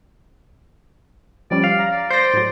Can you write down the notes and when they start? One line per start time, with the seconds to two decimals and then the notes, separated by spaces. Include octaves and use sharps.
1.51 F3 G3 C#4 D5
1.64 F5
1.79 A#5
1.91 D5
2.10 C5 D5 G6 A#6
2.33 A2 F#3